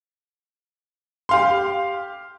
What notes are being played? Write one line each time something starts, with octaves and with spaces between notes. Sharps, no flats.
G4 F5 C6